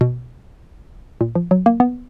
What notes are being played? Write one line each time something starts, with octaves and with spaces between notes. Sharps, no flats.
B2
A#2
F3
F#3
A#3
B3